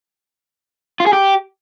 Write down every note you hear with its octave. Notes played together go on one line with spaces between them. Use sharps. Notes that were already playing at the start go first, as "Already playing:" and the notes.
F4
G#4
G4